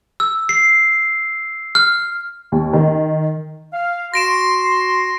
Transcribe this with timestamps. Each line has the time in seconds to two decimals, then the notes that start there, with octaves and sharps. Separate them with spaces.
0.20 E6
0.49 C7
1.75 F6
2.52 D#2
2.73 D#3
3.73 F5
4.14 F#4 C6 A#6 D7 E7